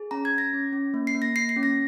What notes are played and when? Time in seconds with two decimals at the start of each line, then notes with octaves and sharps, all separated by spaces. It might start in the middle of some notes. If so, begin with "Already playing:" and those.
Already playing: G#4
0.11 C#4 A#5
0.25 G#6
0.32 C#4
0.38 A#6
0.53 C#4
0.73 C#4
0.94 A#3
1.07 C7
1.15 A#3
1.22 A#6
1.35 A#3 C7
1.49 C7
1.56 C#4
1.63 A#6